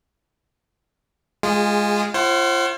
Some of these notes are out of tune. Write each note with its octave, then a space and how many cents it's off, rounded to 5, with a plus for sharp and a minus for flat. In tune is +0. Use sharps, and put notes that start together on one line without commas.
G#3 +0 F4 +0 G#4 -25
F4 -30 C5 +35 F#5 +30